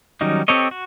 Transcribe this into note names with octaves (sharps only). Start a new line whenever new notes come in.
D#3 F#3 G3 C#4 D#4
C4 G4 A4 C#5 D#5
F#4